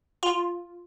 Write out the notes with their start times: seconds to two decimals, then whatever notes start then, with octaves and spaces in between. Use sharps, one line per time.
0.23 F4